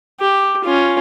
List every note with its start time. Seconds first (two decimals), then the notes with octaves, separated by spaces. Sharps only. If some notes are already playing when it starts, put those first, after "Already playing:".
0.20 G4
0.64 C#4 F4